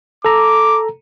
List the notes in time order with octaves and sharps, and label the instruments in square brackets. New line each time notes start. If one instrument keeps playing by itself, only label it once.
[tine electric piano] A4 A#5 [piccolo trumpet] D6